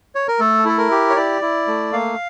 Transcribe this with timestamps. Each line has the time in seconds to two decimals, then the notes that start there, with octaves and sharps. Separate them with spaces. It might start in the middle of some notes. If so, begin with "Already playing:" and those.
0.15 C#5
0.28 A#4
0.39 A3 A4
0.65 E4 A4
0.78 A#4
0.91 G4
1.10 C#5
1.16 E4 D5
1.42 E4
1.67 A3
1.92 A#3 F5